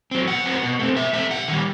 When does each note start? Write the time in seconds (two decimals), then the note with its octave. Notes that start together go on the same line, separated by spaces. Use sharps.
0.11 F#3 C4
0.28 B2 F#5
0.45 F#3 C4
0.63 B2
0.79 A3 C4
0.96 B2 E5
1.13 A3 C4 E5
1.31 C3 F#5
1.48 D#3 G3